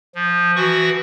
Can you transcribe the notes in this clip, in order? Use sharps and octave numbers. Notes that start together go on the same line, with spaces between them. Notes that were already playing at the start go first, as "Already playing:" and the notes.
F3
E3 F#4 C#6 D#6